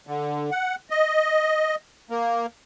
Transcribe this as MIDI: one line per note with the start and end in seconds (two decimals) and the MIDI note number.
0.07 0.50 50
0.51 0.75 78
0.90 1.75 75
2.10 2.46 58